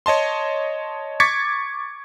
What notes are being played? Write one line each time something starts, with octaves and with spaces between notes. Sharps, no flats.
C#5 D#5 A5 C6
C#6 D6 G#6 A6 B6 C#7